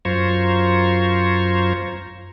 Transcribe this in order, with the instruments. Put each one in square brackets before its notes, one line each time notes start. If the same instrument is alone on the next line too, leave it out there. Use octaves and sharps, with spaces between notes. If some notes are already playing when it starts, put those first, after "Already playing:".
[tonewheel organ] F#2 F4 C5 A#5 C#6 G#6